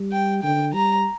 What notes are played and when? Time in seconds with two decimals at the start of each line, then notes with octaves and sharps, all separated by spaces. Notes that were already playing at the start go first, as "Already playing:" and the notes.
Already playing: G3
0.12 G5
0.43 D3 G5
0.74 G3 A#5